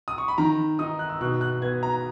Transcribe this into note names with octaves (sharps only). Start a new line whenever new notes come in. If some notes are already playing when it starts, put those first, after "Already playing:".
D#6
C#6
B5
D#3 A#5
D#4 D#6
F#6
E6
B2 F#6
F#6
B3 G#6
A#5